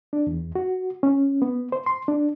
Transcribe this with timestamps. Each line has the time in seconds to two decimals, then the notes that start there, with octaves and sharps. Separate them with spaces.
0.13 D4
0.27 E2
0.55 F#4
1.03 C#4
1.42 B3
1.72 C5
1.86 C6
2.08 D4